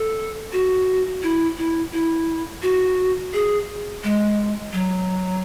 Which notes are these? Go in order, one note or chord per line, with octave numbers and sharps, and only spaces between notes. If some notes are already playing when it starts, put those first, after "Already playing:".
Already playing: A4
F#4
E4
E4
E4
F#4
G#4
G#3
F#3